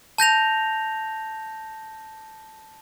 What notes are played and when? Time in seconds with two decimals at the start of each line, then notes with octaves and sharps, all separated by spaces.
0.18 A5 G6 A#6 F7